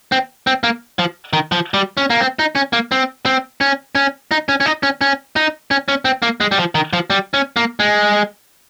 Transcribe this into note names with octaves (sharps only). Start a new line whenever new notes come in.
C4
C4
A#3
F3
D#3
F3
G3
C#4
A#3
C4
D#4
C#4
A#3
C4
C4
C#4
C#4
D#4
C#4
C#4
D#4
C#4
C#4
D#4
C#4
C#4
C4
A#3
G#3
G3
F3
D#3
F3
G3
C#4
A#3
G#3